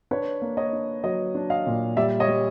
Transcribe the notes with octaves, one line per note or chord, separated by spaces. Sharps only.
D4 B4 C#5
A#3
C#5 D#5
D4
F#3 C#5 D#5
D4
D#5 F5
A#2
G3 D5 E5
C#5 D#5
G3